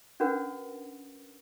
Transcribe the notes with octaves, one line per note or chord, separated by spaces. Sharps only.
C#4 D4 F#4 A#4 B4 F#5